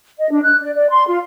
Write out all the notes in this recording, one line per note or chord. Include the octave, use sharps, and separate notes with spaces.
D#5
D4
F#6
D5
D5
C6
F4